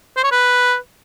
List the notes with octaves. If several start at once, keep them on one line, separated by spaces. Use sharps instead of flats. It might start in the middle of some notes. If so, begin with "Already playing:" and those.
C5
C#5
B4